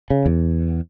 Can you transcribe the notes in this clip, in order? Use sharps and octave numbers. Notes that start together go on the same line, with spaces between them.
C#3
E2